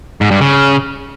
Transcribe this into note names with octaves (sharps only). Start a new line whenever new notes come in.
G#2
G2
C#3